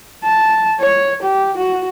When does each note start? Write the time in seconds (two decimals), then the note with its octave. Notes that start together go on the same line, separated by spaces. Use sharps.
0.23 A5
0.80 C#5
1.22 G4
1.57 F#4